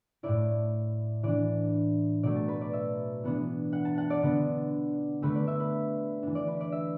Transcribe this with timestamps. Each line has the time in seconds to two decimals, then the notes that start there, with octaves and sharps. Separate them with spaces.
0.23 A2 A3 E4 D5
1.23 E3 D4 D5
2.23 B2 F#3 A3 D5
2.36 A5
2.48 B4
2.61 D5
2.73 E5
3.23 E3 B3 D4
3.72 F#5
3.85 A5
3.98 F#5
4.10 D5
4.23 D3 B3 D4
5.22 D3 A3 D4 B4
5.35 D5
5.47 E5
5.60 B4
6.23 E3 D4
6.35 D5
6.47 B4
6.61 D5
6.72 E5